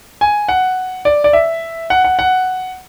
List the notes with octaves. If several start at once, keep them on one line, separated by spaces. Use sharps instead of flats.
G#5
F#5
D5
D5
E5
F#5
F#5
F#5